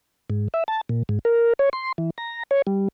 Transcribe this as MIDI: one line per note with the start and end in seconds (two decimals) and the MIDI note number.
0.30 0.48 44
0.54 0.64 76
0.68 0.81 81
0.89 1.03 46
1.09 1.19 44
1.25 1.53 70
1.59 1.69 73
1.73 1.92 84
1.98 2.10 52
2.18 2.43 82
2.51 2.62 73
2.67 2.88 55